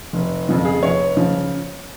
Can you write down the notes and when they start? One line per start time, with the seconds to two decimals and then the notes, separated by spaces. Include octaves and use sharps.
0.13 F1
0.49 F2 C#3 F3
0.65 G#4
0.83 F1 C#5
1.17 C#3 F3